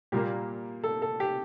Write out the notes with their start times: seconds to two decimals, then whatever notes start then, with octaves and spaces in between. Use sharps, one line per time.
0.12 A#2 G3 A#3 G4
0.84 A4
1.02 A4
1.20 G4